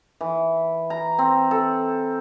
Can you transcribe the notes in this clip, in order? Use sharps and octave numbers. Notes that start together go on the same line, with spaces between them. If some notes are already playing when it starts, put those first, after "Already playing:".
E3
A#5
C4
A4